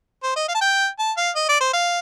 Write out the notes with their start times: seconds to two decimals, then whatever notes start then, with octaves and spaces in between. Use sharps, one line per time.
0.23 C5
0.36 D#5
0.49 F5
0.55 A5
0.61 G5
0.99 A5
1.17 F5
1.35 D#5
1.49 D5
1.61 C5
1.74 F5